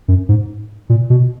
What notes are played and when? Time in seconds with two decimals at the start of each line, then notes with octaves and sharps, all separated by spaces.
0.08 F#2
0.29 G#2
0.89 A#2
1.10 B2